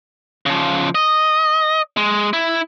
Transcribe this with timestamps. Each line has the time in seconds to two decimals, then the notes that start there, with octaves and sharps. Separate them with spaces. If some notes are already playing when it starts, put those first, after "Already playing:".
0.46 C#3 F3
0.95 D#5
1.97 G#3
2.33 E4